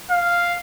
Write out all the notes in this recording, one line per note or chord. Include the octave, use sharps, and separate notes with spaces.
F5